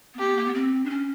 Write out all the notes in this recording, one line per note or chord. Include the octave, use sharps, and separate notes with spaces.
B3
A#3 C4 G4
B3
A#3
B3
C4
D4
C#4